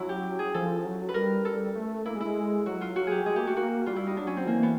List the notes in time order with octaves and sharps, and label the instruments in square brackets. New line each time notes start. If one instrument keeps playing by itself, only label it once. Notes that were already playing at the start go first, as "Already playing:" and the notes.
Already playing: [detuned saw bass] F#3 [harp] C#4 E4
[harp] G4
G#4
[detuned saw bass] F3 [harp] A4
[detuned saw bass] F#3
[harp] B4
[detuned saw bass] G3 [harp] A#4
[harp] A4
[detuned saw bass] A3
[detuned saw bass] A#3 [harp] E4
[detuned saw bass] G#3
[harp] E4
[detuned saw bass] G#3
[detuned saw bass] F#3 [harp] F#4
[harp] F4
F#4
G4 G#4
[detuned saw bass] G#3 [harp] G#4
[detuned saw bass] A#3 [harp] G4
[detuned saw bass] A3 [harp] F#4
[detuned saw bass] A#3 [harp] F#4
[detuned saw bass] G3 [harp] F4
[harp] E4
D#4
[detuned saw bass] F#3 [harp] D4
[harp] C#4
C4
[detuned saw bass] E3 [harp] A#3
[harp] B3